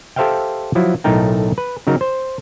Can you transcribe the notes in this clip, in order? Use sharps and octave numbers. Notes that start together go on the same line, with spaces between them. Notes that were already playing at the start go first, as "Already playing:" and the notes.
G4 A4 C5 E5 F5 G5
F3 F#3 E4
B1 A2 A3 D#4 A#4 G5
B4
C#3 F#3 D#4 A#4
C5